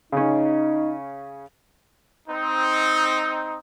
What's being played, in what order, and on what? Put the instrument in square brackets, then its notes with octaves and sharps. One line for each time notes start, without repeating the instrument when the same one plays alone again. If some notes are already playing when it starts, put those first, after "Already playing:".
[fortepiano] C#3 C#4 [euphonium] D#4
[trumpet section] C4 D#4